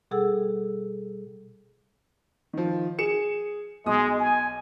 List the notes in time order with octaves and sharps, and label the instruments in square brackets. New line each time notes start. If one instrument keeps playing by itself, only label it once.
[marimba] B2 G3 G#4 A4 F#5 E6
[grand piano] D#3 F3
G#4 C#7 E7
[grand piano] B1 D#6 [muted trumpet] G#3
[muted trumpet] G#5